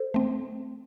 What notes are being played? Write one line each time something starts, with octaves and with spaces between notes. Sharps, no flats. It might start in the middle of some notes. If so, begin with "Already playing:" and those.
Already playing: A4 C5
A3 C4